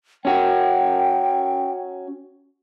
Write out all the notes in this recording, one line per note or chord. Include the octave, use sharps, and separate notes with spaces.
C#4 F#4 G5